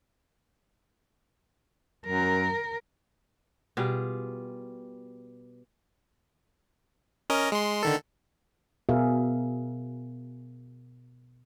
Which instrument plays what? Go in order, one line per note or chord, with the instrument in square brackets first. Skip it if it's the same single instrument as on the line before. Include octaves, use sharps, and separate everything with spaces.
[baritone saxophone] F#2 [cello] A#4
[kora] B2 G3 F4 G#4
[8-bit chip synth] C#4 A#4 D#5
G#3 C6
D3 D#3 A4
[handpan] B2 G#4 A#4 E5 F5